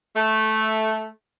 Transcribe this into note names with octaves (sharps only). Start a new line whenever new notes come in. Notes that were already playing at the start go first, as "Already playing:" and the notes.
A3